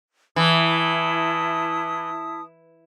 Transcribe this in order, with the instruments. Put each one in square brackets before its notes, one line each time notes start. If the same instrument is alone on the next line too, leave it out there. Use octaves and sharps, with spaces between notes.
[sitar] E3 [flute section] E4 A5 D#6